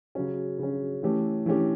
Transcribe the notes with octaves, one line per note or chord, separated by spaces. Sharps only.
C#3 F#3 C#4
C#3 F#3 C#4
E3 A3 C#4 G4
E3 A3 C#4 G4